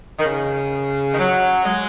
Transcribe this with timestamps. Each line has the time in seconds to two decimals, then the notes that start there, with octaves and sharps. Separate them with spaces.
0.19 D#3
0.25 C#3
1.12 D#3
1.18 F#3
1.65 G#3